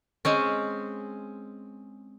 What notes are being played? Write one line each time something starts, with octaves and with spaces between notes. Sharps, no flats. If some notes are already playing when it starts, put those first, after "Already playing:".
G#3 C4 C#4